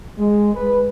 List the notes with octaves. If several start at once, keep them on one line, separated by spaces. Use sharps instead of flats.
G#3
B4